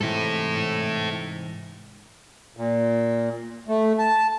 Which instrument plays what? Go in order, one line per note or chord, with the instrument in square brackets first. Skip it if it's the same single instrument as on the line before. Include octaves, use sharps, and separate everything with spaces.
[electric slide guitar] G#2 C3 E3 [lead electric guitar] E4 A4
[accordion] A#2
A3
A5